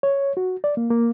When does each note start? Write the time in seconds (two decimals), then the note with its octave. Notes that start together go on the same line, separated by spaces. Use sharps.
0.03 C#5
0.37 F#4
0.64 D5
0.77 A#3
0.91 A#3